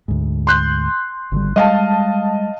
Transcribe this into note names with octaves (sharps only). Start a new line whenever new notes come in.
D2 G#2
C6 F#6 G6
G#1 D3 G3
G3 G#3 D#5 F5 A5